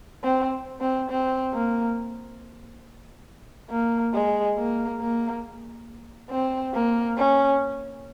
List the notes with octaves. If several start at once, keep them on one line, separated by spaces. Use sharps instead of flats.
C4
C4
C4
A#3
A#3
G#3
A#3
A#3
C4
A#3
C#4